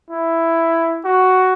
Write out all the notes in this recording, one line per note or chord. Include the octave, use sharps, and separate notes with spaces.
E4
F#4